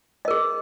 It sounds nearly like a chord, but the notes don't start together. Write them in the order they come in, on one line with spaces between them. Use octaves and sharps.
D#5 A#4 G#4